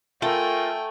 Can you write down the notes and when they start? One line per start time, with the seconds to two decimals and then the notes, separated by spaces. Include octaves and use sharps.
0.22 A3 F4 A4 A#4 G5 G#5